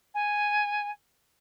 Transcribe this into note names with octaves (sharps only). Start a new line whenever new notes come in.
G#5